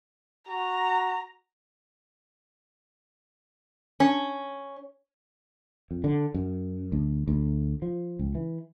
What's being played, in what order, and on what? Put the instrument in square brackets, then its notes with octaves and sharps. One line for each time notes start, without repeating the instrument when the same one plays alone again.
[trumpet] F#4 [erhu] A#5
[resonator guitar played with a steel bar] C#4
[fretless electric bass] F2
D3
F#2
D2
D2
F3
C#2
E3